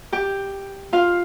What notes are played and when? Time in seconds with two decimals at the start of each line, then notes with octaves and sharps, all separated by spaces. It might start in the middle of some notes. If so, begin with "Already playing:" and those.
0.12 G4 G5
0.93 F4 F5